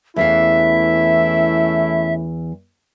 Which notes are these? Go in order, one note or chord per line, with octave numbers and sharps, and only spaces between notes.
E2 E3 A3 C#4 E4 E5 F5